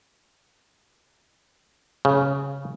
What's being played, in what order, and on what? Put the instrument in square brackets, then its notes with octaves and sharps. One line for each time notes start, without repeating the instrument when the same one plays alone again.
[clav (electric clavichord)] C#3